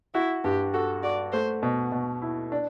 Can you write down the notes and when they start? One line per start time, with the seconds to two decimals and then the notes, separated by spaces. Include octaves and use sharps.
0.14 E4 F#4
0.44 G2 G4
0.74 F#4 A4
1.03 F#4 D5
1.32 A3 C5
1.63 B2
1.92 B2
2.22 E4
2.52 D4